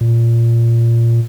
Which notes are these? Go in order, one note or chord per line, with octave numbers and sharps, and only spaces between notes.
A#2